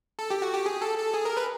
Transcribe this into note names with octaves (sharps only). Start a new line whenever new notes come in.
A4
G4
F#4
G4
G#4
A4
A4
G#4
A#4
B4